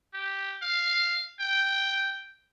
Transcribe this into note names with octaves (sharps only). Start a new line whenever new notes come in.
G4
F5
G5